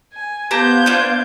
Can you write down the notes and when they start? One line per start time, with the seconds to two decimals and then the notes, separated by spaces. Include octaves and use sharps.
0.13 G#5
0.51 B3 G4 C5 F5 A5 A#5 G6 G#6
0.86 D4 F4